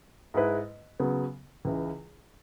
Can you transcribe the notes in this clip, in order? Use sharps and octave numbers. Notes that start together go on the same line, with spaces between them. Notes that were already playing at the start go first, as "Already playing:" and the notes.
G#2 G#3 E4 B4
C#3 F#3 B3
C#2 C#3 E3